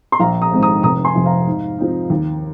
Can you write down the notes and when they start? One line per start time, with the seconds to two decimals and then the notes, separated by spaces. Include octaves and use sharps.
0.12 C6
0.20 A#1 F5 A#5
0.42 A#5 D#6
0.52 G#2 D#3 G#3 C4
0.63 A#5 D#6
0.83 F1 A#5 D#6
1.05 G#5 C6
1.16 F2 C3
1.26 F5 A#5
1.47 G#2
1.78 F3 C4 D#4
2.10 D#2